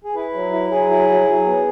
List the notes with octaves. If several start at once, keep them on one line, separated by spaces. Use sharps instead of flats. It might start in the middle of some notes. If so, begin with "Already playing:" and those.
G#4
E4 B4
F#3
E4
F#3 G#4
E4
F#3
F#3
B3